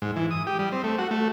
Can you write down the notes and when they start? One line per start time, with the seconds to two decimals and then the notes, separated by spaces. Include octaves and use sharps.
0.02 G#2
0.16 E3
0.31 D#6
0.47 G4
0.59 G3
0.72 C4
0.84 A3
0.99 F#4
1.11 A3